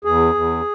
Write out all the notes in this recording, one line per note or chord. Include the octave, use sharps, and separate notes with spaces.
E2 G#4
E2